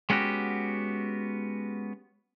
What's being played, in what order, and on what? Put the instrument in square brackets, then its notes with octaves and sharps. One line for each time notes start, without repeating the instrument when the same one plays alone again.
[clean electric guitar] G#3 B3 C#4 F#4 G4